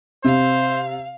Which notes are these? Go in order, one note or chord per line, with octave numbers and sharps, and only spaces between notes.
C3 C5 F5